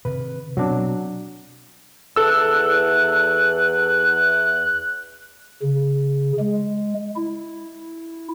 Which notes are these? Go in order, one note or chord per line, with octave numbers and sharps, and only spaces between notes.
C3 D#3 B4
B2 F#3 C4 D4
E2 A4 E6 F#6
C#3
G#3
E4